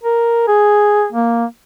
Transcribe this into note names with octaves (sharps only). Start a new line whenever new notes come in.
A#4
G#4
A#3